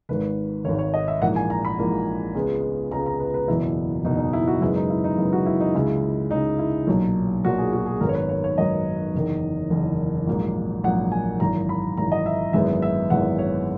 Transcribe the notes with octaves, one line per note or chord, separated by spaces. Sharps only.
G#1 G#2 D#3 B4
G#1 G#2 D#3 C#5
C#5
D#5
E5
A#1 G#2 E3 A#3 F#5
G#5
A#5
B5
A#1 G#2 E3 A#3
C#2 C#3 G#3 B3
C#2 C#3 G#3 B3 A#5
A#5
B4
B4
F#1 E2 B2 E4
F#1 E2 B2 D#4
D#4
E4
F#4
F#2 C#3 G#3 B3 E4
D#4
E4
D#4
F#2 C#3 G#3 B3 E4
F#4
E4
D#4
C#2 C#3 G#3 E4
C#2 C#3 G#3 D#4
E4
B1 A#2 F#3
B1 A#2 F#3 F#4
G#4
F#4
G#4
G#1 F#2 D#3 F#3 B3 A#4
C#5
B4
C#5
C#5
G#1 F#2 D#3 F#3 B3 D#5
F#1 E2 D#3
F#1 E2 D#3
A#1 G#2 F#3 A#3
A#1 G#2 F#3 A#3 F#5
G#5
G#1 F#2 E3 A#5
B5
G#1 F#2 E3 A#5
D#5
E5
G#1 F#2 E3 G#3 B3 E5
E5
G#1 F#2 E3 G#3 B3 F#5
C#5